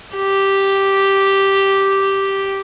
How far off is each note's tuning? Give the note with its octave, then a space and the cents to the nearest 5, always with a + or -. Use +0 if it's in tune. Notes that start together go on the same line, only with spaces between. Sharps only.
G4 -5